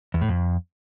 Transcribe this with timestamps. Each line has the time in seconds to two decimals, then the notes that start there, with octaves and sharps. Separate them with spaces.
0.14 E2
0.21 A2
0.29 F2